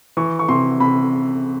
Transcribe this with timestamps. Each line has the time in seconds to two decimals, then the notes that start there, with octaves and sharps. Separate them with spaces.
0.17 E3 C#6
0.39 C#6
0.48 C3 C6
0.80 C3 B5